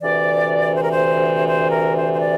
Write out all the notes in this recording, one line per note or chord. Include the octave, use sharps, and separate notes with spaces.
D2 C3 E3 D5
C5
A#4
C5
C5
A#4
C5
C5
D5